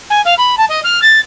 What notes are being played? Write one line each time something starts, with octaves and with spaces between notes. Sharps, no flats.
G#5
F5
B5
A5
D#5
F6
A6